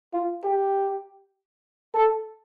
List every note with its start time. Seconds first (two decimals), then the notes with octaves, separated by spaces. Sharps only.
0.13 F4
0.44 G4
1.94 A4